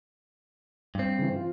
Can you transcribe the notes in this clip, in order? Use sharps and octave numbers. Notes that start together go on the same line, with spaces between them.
G2 C4
C#3 E3
F4